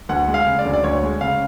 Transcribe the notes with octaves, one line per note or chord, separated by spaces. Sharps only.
D2 F#5
G#3
F5
C#3
D5
D2
D5
D2 C#5
G#3
C#3 F5